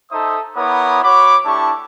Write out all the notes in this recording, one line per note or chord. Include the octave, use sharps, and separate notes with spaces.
D#4 A4 C5 E5 D#6
B3 E4 A#4 C#5 D6 D#6
F#4 C#5 B5 D6
A3 D4 E4 G4 A5 C#6